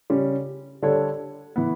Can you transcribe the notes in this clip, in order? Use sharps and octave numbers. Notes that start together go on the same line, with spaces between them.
C#3 G3 C#4
D3 G3 D4 A4 C#5
E3 B3